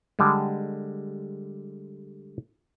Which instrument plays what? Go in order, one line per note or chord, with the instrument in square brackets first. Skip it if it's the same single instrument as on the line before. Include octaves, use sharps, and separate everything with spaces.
[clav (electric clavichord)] D3 G3 G#3